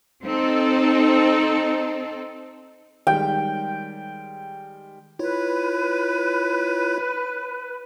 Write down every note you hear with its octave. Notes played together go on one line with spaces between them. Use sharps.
C4 D#4 A4
D#3 G3 G#3 G5
E4 F4 B4 C#5